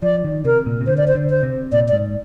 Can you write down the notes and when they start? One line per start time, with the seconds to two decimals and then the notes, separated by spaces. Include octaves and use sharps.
0.02 F3 D5
0.24 D#3
0.45 C3 A#4
0.66 A#2
0.81 C3
0.87 D3 C5
0.97 D5
1.08 C5
1.15 D3
1.30 C5
1.43 C3
1.72 A#2 D5
1.88 D5
1.92 G#2